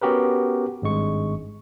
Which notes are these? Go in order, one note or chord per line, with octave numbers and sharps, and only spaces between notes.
B3 C#4 F#4 G4 A#4 B4
G#1 G2 G#3 C#6